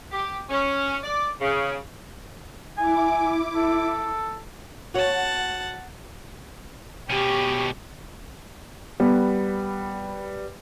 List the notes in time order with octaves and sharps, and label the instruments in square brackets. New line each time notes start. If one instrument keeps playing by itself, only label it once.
[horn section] G4
C#4
D5
C#3
[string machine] E4 D6 [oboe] G#5
[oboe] A4
[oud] F#4 C#5 [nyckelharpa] F#5 A5
[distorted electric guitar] B2 C#4 [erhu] G4
[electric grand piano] G3 B4 [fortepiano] B3